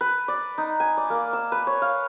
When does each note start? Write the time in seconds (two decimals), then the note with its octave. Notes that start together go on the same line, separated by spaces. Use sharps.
0.01 B4
0.28 D5
0.58 D#4
0.80 G#5
0.97 D5
1.10 A#3
1.33 E6
1.52 B4
1.67 C#5
1.82 F5